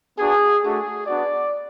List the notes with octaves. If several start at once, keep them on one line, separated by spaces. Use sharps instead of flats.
B3 D4 F#4 G#4
A3 D4 F#4 G#4
B3 D4 F#4 D5